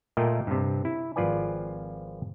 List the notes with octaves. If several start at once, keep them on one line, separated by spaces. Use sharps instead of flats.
A#2 A3 F4 A#4 D#5 G5
G2 C3
E4
G#1 F3 F4 B4 D5 G#5